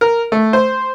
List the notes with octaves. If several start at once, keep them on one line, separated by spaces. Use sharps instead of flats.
A#4
A3
C5